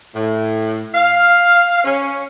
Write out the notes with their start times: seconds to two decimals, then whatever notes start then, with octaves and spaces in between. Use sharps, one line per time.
0.15 A2
0.95 F5
1.84 C#4